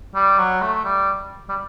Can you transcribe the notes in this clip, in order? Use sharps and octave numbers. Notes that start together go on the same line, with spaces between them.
G3
F#3
A3
G3
G3